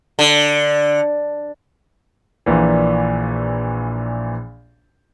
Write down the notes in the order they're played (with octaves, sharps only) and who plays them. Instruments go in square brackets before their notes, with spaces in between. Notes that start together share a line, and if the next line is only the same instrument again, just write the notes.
[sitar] D3
[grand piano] A#1 A#2 E3